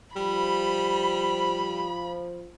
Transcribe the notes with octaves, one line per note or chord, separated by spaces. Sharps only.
F3 G3 B5